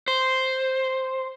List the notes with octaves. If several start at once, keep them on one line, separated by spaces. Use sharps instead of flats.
C5